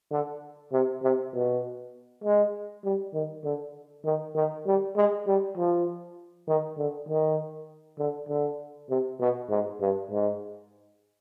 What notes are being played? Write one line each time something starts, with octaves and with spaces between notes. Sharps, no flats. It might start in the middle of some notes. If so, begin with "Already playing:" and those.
D3
C3
C3
B2
G#3
G3
D#3
D3
D#3
D#3
G3
G#3
G3
F3
D#3
D3
D#3
D3
D3
C3
B2
G#2
G2
G#2